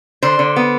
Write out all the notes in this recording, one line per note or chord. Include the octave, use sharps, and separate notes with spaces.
D3 C5
D3
B3